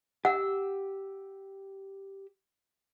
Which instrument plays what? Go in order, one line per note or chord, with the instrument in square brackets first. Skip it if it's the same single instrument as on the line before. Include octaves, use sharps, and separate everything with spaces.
[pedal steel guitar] G4 E6 [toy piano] F#5